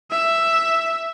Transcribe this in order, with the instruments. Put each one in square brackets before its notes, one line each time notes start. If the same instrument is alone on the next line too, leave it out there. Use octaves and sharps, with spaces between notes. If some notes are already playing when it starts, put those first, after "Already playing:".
[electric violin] E5